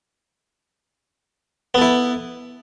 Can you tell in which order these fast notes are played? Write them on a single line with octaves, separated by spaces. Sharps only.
B3 A4 E4